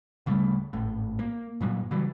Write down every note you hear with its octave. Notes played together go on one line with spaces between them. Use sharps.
D1 C#3 G3 A3
G#1 A2
A#3
G2 A#2 F#3 A#3
C#3 E3 F#3 G3